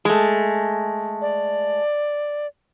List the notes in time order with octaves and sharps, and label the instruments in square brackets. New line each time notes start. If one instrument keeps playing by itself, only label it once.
[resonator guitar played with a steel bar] G#3 A3
[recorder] D5